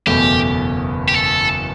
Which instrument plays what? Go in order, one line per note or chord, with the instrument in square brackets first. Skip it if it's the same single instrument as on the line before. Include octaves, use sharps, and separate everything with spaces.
[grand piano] F#1 E2 B2 A3 [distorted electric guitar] G4
[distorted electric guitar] G4
A4